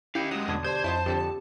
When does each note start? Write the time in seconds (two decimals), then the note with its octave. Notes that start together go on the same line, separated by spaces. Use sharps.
0.15 C#4 E4 G4 D#5 F5 G6 C#7
0.31 F#3 G#3 D#6
0.48 E2 B2 D3 A5 G#6
0.64 G4 C5 D5 A5 G#6
0.84 F2 E4 F4 C#5 D#5 A5
1.06 F2 D3 G4 A4